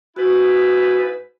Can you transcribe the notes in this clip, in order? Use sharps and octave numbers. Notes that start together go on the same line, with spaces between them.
G#2 E4 F#4 B4